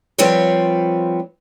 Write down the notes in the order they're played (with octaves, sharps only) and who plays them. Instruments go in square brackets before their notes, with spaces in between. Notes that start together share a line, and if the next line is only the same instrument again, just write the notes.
[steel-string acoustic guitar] F3 G3 C4 F4 B4 C#5